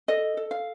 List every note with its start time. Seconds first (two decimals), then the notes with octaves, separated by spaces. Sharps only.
0.08 A4 D#5
0.37 A4
0.51 F5